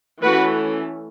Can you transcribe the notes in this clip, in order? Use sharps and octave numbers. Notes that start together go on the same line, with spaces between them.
E3 A3 C#4 F#4 B4